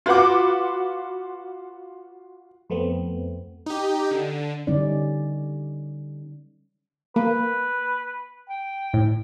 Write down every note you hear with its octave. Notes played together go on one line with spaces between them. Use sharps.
F4 F#4 B4 F#5 D6
F2 A3 B3 C4
D#4 G4
D3
D3 G3 C#4 D#4 D5
A#3 B4
G5
A2